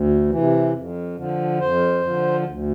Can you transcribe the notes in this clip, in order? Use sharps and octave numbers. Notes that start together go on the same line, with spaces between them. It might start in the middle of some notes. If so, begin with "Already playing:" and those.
Already playing: D2
C3 E3
F2
D3 F3
F2 C5
D3 F3
D2